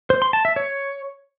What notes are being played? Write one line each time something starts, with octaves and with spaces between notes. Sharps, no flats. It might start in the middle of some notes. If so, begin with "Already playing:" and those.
C5
C6
A5
E5
C#5